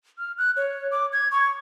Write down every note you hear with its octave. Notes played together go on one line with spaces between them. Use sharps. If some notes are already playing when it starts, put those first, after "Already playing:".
F6
F#6
C#5
D6
G#6
C#6